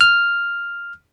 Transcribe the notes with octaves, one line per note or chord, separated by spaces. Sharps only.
F6